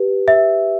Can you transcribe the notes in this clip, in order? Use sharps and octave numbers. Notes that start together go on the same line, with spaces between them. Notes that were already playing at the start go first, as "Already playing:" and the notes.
Already playing: G4 B4
E5